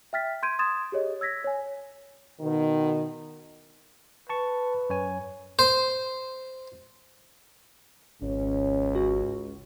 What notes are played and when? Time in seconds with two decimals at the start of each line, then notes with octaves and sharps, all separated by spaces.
0.13 E5 G5 F6 A6 B6
0.43 C6 G6 G#6 D7 D#7
0.59 C6 D#6 G#6 A6 E7
0.92 G4 G#4 C#5 D#5
1.21 E6 G#6 A#6 B6
1.44 C#5 G#5
2.41 B2 D#3
4.29 B4 A5 C#6
4.90 F#2 C#5 G#5
5.59 C5
8.22 G#1 C#2 C#4
8.95 F#4